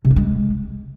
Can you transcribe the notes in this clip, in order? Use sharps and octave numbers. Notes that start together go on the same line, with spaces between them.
C3
D4
G#3